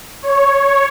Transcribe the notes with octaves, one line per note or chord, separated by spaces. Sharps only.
C#5